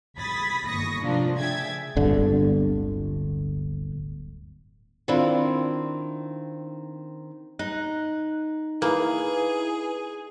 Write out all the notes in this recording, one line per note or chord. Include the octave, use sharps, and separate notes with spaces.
B5 D#6 G#6 A6 B6
G1 D#2 C#6 D#6 A#6
A2 C3 F3 A#3 D4 F4
C#3 G#4 E5 G5 G#6 A6
D1 G1 D3
D#3 C4 D4 E4 F4
D#4 F#6
A#3 E4 G#4 B4